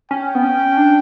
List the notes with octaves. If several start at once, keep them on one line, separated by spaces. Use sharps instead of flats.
C#4 G5
B3
C#4
D4